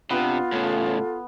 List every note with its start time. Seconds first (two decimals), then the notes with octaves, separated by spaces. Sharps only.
0.10 C3 B3 D4 F4
0.52 A2 C#3 A4